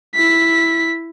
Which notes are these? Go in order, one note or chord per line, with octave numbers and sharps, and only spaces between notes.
E4 B6